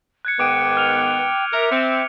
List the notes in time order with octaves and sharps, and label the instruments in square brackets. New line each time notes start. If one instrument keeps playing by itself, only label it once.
[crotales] F#6 G#6 C#7
[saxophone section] G#2 D#3 B3 [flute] G5 [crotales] D6 D7 D#7
[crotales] F6 F7
[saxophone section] A#4 [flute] E5
[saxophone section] C4 [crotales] C#7